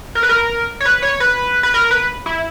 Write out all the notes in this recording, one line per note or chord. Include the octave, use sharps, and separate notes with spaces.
A#4
B4
A#4
C#5
B4
C#5
B4
B4
A#4
B4
E4